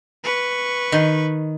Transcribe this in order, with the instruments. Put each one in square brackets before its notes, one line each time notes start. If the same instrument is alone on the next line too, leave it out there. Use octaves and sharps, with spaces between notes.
[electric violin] B4 C#6
[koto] D#3